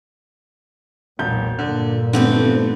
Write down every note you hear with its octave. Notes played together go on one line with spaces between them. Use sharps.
E1 B1 A#2 G6
G2 A#2 D3
F1 E2 D3 A3 C4 B4